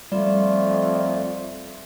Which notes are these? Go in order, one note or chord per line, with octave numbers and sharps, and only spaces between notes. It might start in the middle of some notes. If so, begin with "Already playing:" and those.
F2 G3 A3 F4 D5